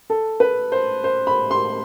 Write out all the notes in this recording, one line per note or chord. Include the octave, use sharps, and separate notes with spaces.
A4
B4
C5
C5
B5
C6